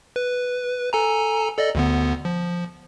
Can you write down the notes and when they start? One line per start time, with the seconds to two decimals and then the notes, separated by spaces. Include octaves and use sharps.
0.16 B4
0.93 A4 G#5 A#5
1.57 A4 D5 D#5
1.75 D2 D3 B3
2.25 F3